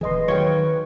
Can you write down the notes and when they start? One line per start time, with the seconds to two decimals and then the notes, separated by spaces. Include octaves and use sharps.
0.01 D#1 E3 G#4 B4 D#5 C6
0.28 D#3 F#3 C5 C#5 F5 G5